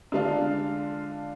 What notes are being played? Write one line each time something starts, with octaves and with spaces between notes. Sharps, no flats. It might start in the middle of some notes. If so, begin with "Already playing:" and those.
D3 G#3 D4 F4